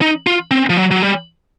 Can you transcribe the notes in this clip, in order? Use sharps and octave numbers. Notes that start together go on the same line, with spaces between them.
D#4
F4
C4
F3
F#3
F#3
G3